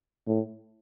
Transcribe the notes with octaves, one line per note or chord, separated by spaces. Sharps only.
A2